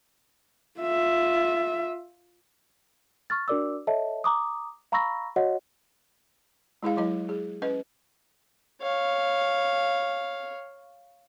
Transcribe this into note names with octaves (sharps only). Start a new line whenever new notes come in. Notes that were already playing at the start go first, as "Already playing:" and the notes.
F4 E5
C#6 F6 A6
D4 F#4 A#4 D5 D6 E6
A4 C#5 D#5 E5 A5
A#5 D6 D#6
F5 A#5 B5 C#6 E6 A#6
F#4 C#5 D#5 F#5
G#3 E4 G#4 F5
F#3 E4 D#5
G#4
C#4 B4 D#5
C#5 F5